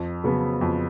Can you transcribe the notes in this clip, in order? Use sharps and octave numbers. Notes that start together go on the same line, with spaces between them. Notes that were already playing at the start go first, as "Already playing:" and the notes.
Already playing: F2
C#3 F#3 B3
F2